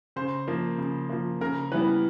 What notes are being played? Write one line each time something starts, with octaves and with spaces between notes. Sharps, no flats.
C#3 C5
F3 A#3
C#3
F3 A#3
C#3 A#4
E3 G3 B3 B4